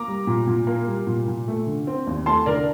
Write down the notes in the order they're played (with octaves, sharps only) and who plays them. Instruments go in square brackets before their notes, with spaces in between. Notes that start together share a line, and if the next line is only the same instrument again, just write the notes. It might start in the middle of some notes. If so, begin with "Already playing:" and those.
Already playing: [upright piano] A#3 A#5 D6
G3
A#2
A#2
A#3
G3
A#2
A#2
A3
D3
C4
D#2
A3 A5 C6
D3 A#4 D5